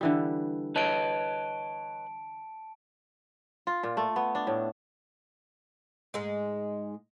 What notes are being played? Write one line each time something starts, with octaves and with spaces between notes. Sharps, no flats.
D3 E3 G3
B4 C#5 D#5 A5 D7
F4
A#2
A3
B3
D4
A2
G#2 G#3